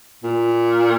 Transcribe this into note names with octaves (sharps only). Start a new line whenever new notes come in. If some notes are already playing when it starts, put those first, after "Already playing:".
A#2